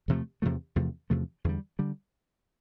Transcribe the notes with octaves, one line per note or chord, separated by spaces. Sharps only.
E2 C3 F3 A3
E2 C3 F3 A3
E2 C3 F3 A3
E2 C3 F3 A3
E2 D3 G3
D3 G3